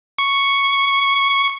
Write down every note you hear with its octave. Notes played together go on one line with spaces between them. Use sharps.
C#6